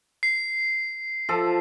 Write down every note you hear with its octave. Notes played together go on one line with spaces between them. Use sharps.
C7
F3 A4